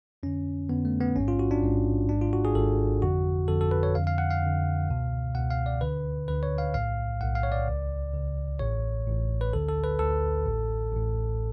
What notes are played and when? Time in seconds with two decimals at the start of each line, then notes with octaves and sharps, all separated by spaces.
0.23 F2 D3 C#4
0.69 F2 D3 B3
0.85 A3
1.00 B3
1.16 A1 G#2 C#4
1.28 F4
1.39 F#4
1.51 D4
1.63 A1 G#2
2.09 G#1 G#2 D4
2.21 F4
2.33 F#4
2.45 G#4
2.55 G#1 G#2 A4
3.02 F2 D3 F#4
3.48 F2 D3 A4
3.61 A4
3.71 B4
3.83 C#5
3.95 F2 D3 F5
4.07 F5
4.18 F#5
4.31 F5
4.42 F2 D3
4.88 C#2 B2
5.35 C#2 B2 F#5
5.51 F5
5.66 D5
5.81 D2 D3 B4
6.28 D2 D3 B4
6.43 C#5
6.58 F5
6.74 B1 A2 F5
7.20 B1 A2 F#5
7.35 F5
7.43 C#5
7.52 D5
7.68 C#2 C#3
8.13 C#2 C#3
8.59 A1 A2 C#5
9.07 A1 A2
9.41 B4
9.53 D2 D3 A4
9.69 A4
9.84 B4
9.99 D2 D3 A4
10.46 A1 A2
10.92 A1 A2